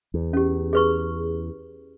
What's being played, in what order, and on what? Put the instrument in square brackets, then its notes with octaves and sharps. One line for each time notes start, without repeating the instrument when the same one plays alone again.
[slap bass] E2
[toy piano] C#4 G4
G#4 B4 C#6